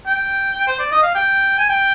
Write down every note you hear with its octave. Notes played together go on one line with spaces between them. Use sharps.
G5
C5
D5
D#5
F5
G5
G#5
G5